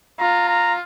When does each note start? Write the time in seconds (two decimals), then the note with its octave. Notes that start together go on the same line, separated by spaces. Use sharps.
0.19 F4 A#5
0.48 A#5